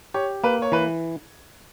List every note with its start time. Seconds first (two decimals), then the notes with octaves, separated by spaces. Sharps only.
0.14 G4 C#5
0.44 A#3 B4
0.62 C#5
0.72 E3 B4